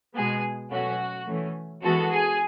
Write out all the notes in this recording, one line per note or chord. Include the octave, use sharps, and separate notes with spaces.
B2 G#3 B3 G#4
B2 F#3 A3 C#4 F#4
E3 A3 C#4
E3 G#3 B3 F#4 A4
G#4